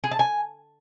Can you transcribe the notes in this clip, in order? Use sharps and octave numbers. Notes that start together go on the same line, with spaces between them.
G#4
A5
G#5